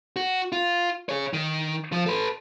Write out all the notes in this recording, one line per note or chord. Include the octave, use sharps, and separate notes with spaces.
F#4
F4
G#4 C#5
D#3
F3
A4 B4